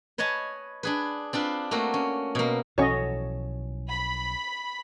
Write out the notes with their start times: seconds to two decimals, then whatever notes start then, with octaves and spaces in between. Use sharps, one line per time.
0.18 B4 C#5 D#5 G#5 A5
0.83 D4 G#4 B4
1.33 C4 D4 F4 B4
1.71 A3 A#3 C4 F#4
1.94 C#4
2.35 B2 A#3
2.78 B1 E3 F3 C#4 F#4 A4 C#5 D#5
3.90 B5